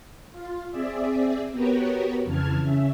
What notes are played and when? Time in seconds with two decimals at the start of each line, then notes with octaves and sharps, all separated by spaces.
0.32 F4
0.70 C4 G#4 D5 E5
1.51 B3 F#4 G4 A#4 B4 C#5
2.24 F2 C#3 E3 A5 F6 G#6
2.61 C#3 C#4 E5